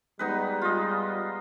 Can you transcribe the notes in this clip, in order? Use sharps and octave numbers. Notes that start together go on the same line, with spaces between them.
G3 G#3 B3 D#4 B4
F4 D#5